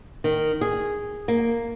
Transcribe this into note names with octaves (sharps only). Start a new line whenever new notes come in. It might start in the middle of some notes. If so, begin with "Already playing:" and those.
D#3
G#4
A#3